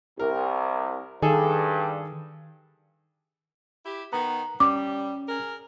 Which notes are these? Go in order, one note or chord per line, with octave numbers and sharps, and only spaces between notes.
C2 A#4
G2 D#3 G#4 A4
E4 G4
D#3 B3 A#5
G3 C#4 D6
G#4 A#4